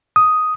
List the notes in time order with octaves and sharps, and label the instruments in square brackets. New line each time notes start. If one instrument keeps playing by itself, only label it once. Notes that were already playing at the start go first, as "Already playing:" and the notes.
[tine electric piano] D#6